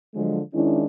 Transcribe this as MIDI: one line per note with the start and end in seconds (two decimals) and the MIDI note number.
0.15 0.40 50
0.15 0.40 53
0.15 0.40 54
0.15 0.40 56
0.53 0.85 51
0.53 0.85 56
0.53 0.85 61
0.53 0.85 62
0.53 0.85 64